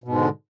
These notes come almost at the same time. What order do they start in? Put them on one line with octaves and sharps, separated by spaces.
B2 G#2 G#3 D3